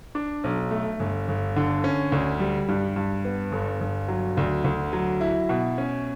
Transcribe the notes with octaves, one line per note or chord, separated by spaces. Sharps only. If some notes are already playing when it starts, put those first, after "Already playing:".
D4
B1
A3
G1
G1
D3
C#4
D2
G3
G2
G2
B3
G1
G1
F#3
D2
D2
F#3
E4
B2
C#4